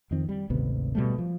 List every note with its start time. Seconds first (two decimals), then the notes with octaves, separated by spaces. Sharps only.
0.11 F2 D#3 C4
0.29 G3
0.50 G#1 D2 C3 B3
0.95 B2 G3 A3
1.18 F3